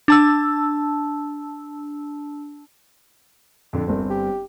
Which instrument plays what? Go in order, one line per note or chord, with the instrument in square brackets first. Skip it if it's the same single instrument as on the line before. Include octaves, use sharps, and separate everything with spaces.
[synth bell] D4 A5 E6
[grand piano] F2 D3
[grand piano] G1 C4 [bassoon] C2
[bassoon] G4